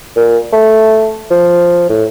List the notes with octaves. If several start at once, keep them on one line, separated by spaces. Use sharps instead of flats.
A#2
A3
F3
A2